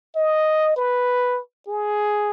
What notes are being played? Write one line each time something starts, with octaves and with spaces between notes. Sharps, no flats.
D#5
B4
G#4